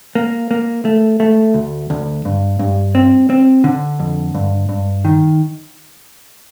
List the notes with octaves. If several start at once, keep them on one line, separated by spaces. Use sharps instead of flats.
A#3
A#3
A3
A3
D2
D2
G2
G2
C4
C4
D3
F2
G2
G2
D#3